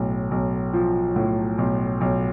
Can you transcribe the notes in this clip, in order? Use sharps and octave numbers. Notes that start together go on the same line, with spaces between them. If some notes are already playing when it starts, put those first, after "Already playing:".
Already playing: B1 A2
B1
F3
A2
B1
B1